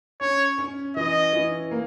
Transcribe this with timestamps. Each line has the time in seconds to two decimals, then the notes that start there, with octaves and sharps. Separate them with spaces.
0.21 C#4 C#5
0.58 C#4
0.96 E3 D#5
1.33 E3
1.71 A#3